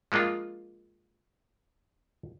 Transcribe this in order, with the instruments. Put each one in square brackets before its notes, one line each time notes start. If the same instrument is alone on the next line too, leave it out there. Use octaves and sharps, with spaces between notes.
[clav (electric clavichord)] F3 G#3 A#3 D4 F4